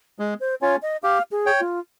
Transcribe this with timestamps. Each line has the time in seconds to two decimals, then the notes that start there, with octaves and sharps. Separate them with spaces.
0.19 G#3 G#4
0.40 C5
0.61 C#4 F4 C#5
0.82 D#5
1.03 G4 F5
1.32 G#4
1.46 C#5 G5
1.60 F4